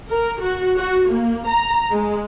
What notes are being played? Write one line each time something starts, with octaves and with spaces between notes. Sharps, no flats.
A#4
F#4
F#4
A#3
A#5
G#3